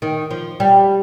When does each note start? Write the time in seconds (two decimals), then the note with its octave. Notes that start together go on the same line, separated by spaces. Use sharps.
0.02 D#3
0.31 F3
0.60 G3